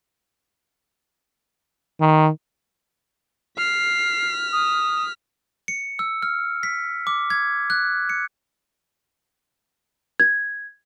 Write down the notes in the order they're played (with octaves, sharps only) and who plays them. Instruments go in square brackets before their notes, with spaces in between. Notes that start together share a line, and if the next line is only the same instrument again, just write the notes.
[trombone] D#3
[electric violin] F6 B6 [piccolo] C7
[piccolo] D#6
[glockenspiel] C#7
E6
F6
B6
D6
G#6
F#6
C#7
[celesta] G#6